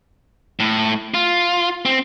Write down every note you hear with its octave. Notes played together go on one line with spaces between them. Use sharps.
A2
F4
C4